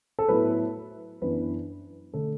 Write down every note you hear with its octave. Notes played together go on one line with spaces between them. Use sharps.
A4
A2 F#3 B3 E4 B4
F#2 E3 B3 D4 B4
D3 A3 A4